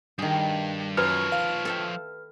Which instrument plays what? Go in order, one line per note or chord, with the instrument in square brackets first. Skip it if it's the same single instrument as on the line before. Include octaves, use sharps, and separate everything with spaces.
[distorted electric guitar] G2 [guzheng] D#3 G#4
[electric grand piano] F#2 [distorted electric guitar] F3 C#5 [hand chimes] B4 F6
[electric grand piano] F5
[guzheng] A4 E5 G5